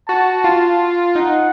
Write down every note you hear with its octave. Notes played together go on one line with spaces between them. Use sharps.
F#4 A5
F4 A5
D#4 F#5